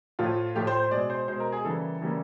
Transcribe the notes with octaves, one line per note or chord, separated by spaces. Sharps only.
A2 F3 A3 F4
A2 F3 A3 G4
C5
C5
B2 G#3 D5
C5
B2 G#3 C5
A#4
G#4
C#3 E3 G3 A#3 A4
C#3 E3 G3 A#3